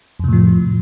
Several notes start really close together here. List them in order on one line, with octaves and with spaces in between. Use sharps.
F2 C3 A2 F3